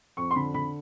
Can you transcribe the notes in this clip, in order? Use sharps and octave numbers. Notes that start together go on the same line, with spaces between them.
F2 C#6
C6
D3 B5
D3 B5